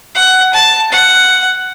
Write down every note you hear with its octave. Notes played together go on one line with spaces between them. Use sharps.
F#5
A5
F#5